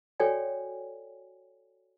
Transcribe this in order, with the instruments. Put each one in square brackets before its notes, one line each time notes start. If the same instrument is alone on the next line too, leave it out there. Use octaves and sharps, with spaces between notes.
[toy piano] F#4 A4 C#5 D5 G5 G#5